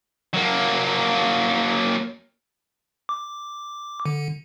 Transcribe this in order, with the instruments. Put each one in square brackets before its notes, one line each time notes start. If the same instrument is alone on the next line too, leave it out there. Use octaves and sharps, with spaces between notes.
[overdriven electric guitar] F#3 A#3
[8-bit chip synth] D6
D3